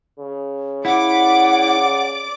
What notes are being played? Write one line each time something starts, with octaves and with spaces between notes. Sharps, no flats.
C#3
E4 D5 F#5 D6